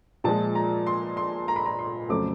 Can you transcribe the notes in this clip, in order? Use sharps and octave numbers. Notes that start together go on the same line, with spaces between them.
A#2 F3 G#3 A5
A#5
C6
C6
A#5
B5
A#5
C6
F2 C#3 F#3 A3 C4 D6